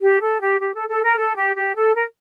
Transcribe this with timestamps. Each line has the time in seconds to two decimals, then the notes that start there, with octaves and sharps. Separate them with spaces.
0.02 G4
0.22 A4
0.40 G4
0.60 G4
0.75 A4
0.89 A4
1.04 A#4
1.17 A4
1.36 G4
1.56 G4
1.75 A4
1.94 A#4